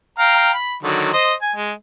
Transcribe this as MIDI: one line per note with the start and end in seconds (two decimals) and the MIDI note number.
0.19 0.51 77
0.19 0.51 79
0.19 0.51 82
0.54 0.76 83
0.83 1.10 50
0.83 1.10 51
0.83 1.10 54
1.13 1.34 72
1.13 1.34 75
1.42 1.53 80
1.56 1.72 56